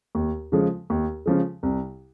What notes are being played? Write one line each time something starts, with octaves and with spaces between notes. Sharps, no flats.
D#2
C#3 F3 G#3
D#2
C#3 F3 G#3
C2